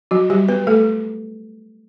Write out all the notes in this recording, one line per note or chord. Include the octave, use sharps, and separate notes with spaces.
F#3 F#4
G3 G4
B3 B4
A3 A4